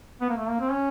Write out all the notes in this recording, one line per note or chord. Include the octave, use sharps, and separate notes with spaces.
B3
A#3
A3
A#3
C4
C#4